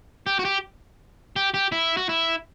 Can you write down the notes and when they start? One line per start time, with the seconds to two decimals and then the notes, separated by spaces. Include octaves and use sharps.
0.27 G4
0.39 F#4
0.45 G4
1.36 G4
1.54 G4
1.72 E4
1.97 F#4
2.09 E4